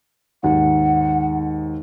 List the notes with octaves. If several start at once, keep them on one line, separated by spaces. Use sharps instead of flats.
D#2 G#2 F#5